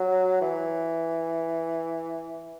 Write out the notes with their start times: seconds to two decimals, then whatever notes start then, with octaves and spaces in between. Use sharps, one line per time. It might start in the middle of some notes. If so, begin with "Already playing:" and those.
Already playing: F#3
0.41 E3